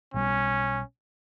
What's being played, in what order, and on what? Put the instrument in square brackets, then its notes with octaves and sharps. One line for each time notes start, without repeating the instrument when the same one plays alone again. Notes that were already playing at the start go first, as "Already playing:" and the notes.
[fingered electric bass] B1 B2 G3 [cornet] C#4